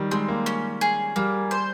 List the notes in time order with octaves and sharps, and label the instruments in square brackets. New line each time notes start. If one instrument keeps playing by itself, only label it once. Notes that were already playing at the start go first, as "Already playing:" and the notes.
Already playing: [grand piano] D#3 G3
[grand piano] G#3 [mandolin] C4
[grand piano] A#3
[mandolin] C#4
G#4
[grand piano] G3 [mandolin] A#3
[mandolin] C5